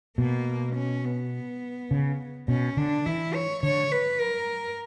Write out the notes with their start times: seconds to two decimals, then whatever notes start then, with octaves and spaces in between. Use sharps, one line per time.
0.18 B2 A#3
0.75 C#4
1.04 B3
1.91 C#3
2.48 B2 C#4
2.77 D3 D4
3.06 E3 E4
3.35 C#5
3.63 D3 C#5
3.92 B4
4.20 A#4